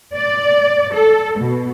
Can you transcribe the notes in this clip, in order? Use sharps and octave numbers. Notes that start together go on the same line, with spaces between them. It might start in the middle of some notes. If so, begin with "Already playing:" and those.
D5
A4
B2